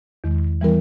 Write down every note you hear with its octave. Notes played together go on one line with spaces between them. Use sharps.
E2 D#3 G#3
E3 G3 B3 E4 A#4